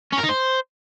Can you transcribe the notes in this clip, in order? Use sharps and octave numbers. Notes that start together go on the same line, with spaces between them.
C#4
A#4
D#4
C5